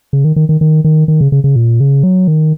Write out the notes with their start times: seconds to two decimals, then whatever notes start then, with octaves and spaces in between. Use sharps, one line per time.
0.13 C#3
0.25 D#3
0.36 D#3
0.49 D#3
0.61 D#3
0.84 D#3
1.08 D#3
1.21 C#3
1.32 C#3
1.44 C#3
1.56 A#2
1.80 C#3
2.03 F#3
2.28 D#3